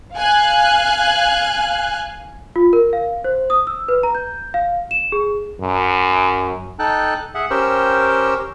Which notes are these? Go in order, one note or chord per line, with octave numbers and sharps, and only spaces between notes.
F5 G#5 F#6
F4
A#4
F5
C5
D#6
E6
B4
A#5
G6
F5
E7
G#4
F#2
D#4 A4 G5 A5 F#6
G#4 E5 F#5
C#4 G4 A#4 C5 G5 E6